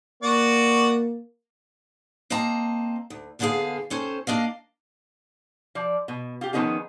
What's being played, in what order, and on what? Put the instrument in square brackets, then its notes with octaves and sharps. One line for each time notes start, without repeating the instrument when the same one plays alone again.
[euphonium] A#3 [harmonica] F#4 D5 F#5
[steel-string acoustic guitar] A#3 C4 D#5 A5 A#5
D2
E2 D3 B3 C#4 G#4 F5
C3 C#4 A4 C5
A#3 D4 D#5 F5
[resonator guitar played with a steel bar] F3 D5
B2
F4 G4
D#3 F3 B3 C#4 D#4 G#4